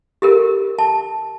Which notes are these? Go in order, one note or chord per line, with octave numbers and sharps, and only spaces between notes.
G4 A4 A#4
A5